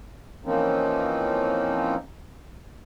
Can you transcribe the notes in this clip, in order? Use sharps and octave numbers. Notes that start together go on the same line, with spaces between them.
E3 F3 A#3 C4 C#4 D#4